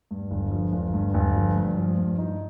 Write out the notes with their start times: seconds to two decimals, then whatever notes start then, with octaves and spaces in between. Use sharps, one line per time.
0.11 G2
0.31 G1
0.51 F3
0.73 G1
0.94 G2
1.14 G1
1.35 F3
1.56 G2
1.77 F3
1.97 G2
2.18 D#4